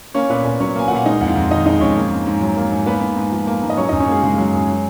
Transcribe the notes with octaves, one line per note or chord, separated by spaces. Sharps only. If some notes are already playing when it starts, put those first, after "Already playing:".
A#3 C#4 C#5
A#2 B3 B4
A#2
F#3 C#4 C#5
A#3 G#5
A#2 F#5
F5
G#3 D#4 D#5
F2 F#5
F4 F5
F2
D#3 D#4 D#5
G#3 D#4 D#5
F2 C#4 C#5
A#3
G#2
G#2
F#3
A#3
G#2
A#3 B3 B4
G#2
G#2
F3
A#3
G#2
D#5
F#3 C#4 C#5
D#4 D#5
F#2
C#4 C#5
G#3 A#3 G#4
C#3 G#3 G#4
F#3
F#2
F#3